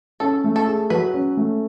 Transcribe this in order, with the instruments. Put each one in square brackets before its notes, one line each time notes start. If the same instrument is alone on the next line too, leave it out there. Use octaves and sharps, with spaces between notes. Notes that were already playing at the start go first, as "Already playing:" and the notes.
[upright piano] C#4 [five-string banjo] A4
[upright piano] A3
[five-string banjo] A4
[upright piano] G#4
[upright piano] F#3 [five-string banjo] B4
[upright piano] C#4
A3